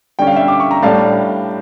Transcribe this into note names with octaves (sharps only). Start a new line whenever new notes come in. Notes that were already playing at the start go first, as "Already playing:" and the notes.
D3 G3 C#4 G5
F5
E5 G5
D6
C#6
A#5
A2 G3 D4 F5 A5